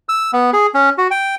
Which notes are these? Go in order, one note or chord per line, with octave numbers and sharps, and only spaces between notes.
E6
B3
G#4
C#4
F#4
G5